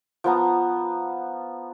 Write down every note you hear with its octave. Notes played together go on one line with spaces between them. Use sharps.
F3 B3 A#5